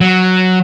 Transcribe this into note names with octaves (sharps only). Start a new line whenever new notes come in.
F#3